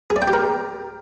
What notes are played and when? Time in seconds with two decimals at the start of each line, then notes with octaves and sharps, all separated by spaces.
0.10 G#4
0.16 D5
0.22 G5
0.28 G4
0.33 A#4